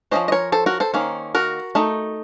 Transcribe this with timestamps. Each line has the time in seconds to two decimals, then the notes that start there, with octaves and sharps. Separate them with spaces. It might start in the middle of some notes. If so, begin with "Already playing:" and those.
0.11 F3 A#3 C#4 C5 D#5
0.28 D#5
0.32 A#4 C#5
0.52 A4 C5
0.66 F#4 A#4
0.80 A4 C5
0.94 D#3 A#3 C#4
1.35 F#4 A#4
1.75 A3 D#4